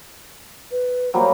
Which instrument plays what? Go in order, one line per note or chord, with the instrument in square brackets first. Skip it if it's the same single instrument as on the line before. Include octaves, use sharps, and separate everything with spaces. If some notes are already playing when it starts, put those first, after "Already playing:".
[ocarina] B4
[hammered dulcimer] F#3 G3 A#3 [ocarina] C5